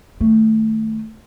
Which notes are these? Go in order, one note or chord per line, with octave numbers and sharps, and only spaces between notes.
D#3 A3